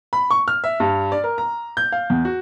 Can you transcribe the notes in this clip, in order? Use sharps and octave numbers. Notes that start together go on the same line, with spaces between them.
B5
C#6
F6
E5
G2
D5
A#4
A#5
G6
F5
E2
F#4